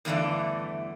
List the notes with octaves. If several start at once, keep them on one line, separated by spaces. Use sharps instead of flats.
E2 G2 D3 E3 A3 D5